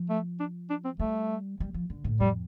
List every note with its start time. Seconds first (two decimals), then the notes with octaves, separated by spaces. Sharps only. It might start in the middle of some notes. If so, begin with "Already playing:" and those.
Already playing: F3
0.10 A3
0.40 D4
0.70 D4
0.85 C4
0.99 G3 A3
1.60 G3
1.74 F3
1.90 D3
2.04 A2
2.20 F2 G3